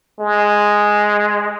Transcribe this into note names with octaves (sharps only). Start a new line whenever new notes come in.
G#3